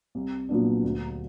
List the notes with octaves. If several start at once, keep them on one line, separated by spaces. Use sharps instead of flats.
C2
A#2 F#3 B3 D4
D2